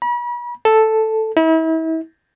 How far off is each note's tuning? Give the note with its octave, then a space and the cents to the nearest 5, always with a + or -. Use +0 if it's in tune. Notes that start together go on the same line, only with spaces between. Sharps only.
B5 -40
A4 +0
E4 -40